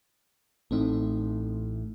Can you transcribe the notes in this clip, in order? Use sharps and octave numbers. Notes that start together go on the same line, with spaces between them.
A1 A2 A3 C4 D#4